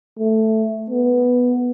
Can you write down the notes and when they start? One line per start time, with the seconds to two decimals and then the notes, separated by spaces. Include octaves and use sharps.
0.19 A3
0.90 B3